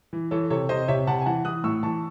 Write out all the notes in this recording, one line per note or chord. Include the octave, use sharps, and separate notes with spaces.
E3
E3 A4 C#5
C3 A4 C#5
C3 C5 D#5
C3 C#5 E5
C3 F#5 A5
G#5
E3 F#5 A5
E3 D#6 F#6
A2 C#6 E6
E3 A5 C#6